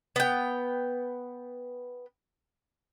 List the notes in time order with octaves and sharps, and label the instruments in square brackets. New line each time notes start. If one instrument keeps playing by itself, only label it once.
[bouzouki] B3 G5